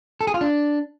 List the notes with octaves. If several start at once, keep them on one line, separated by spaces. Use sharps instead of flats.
A4
G#4
F4
D4